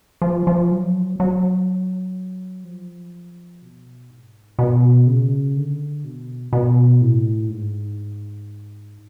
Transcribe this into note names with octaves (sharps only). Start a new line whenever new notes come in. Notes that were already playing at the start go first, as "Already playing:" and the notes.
F3
F3
F#3
F#3
F3
B2
G#2
B2
C#3
D3
B2
B2
A2
G#2